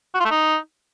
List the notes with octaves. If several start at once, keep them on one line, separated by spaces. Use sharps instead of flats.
F#4
F4
A3
D#4